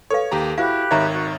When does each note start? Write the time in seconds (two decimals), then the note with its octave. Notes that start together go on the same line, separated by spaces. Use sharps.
0.10 A4 B4 C#5 F5
0.32 D#2 G4 A#5
0.58 E4 F#4 G4 C5 F5 B5 F#6
0.91 G#1 D#3 C#5 E5 A#5
1.11 F#4